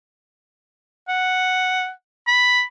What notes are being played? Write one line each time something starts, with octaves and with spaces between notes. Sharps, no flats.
F#5
B5